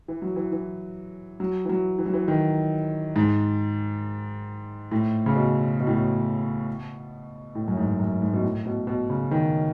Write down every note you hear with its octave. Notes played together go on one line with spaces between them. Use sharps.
E3
F#3
E3
E3
F#3
E3
F#3
E3
F#3
E3
D#3
G#2
A2
C#3
B2
B2
A2
B2
A2
F#2
G#2
F#2
G#2
B2
A2
B2
B2
C#3
D#3